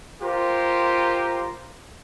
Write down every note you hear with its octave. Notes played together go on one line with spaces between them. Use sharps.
F4 G4 A#4 C5